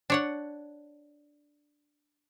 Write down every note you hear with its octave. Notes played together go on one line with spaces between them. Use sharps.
D4 C#5 F#5